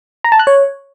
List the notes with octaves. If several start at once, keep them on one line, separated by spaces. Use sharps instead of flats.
A#5
A5
F#6
C#5